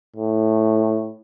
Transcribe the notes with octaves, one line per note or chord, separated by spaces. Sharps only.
A2